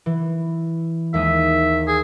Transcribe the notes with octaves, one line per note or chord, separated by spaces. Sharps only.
E3
D#2 G#3 E5 D#6
G#4